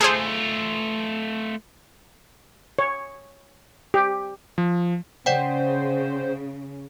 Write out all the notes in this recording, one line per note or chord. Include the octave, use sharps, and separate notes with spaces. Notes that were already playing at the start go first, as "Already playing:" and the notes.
A3 F4 G#4 A4 C5
C#5
G4
F3
C#3 C5 D5 F#5 G5